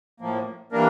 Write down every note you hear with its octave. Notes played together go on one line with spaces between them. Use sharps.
A2 F3 A#3
E3 G3 A#3 D4 A#4